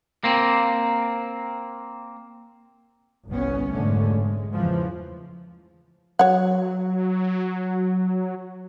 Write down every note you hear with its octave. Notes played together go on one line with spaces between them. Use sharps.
A#3 C4
G1 C2 B3 C#4
F1 G#2 D3 A3 C#4
G#3
E2 C#3 E3 F3
F#3 C#5 F#5